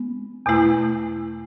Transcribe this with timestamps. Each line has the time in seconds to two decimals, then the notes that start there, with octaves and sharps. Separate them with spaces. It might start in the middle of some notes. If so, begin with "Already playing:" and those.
Already playing: G#3 B3
0.46 E2 B2 A3 E4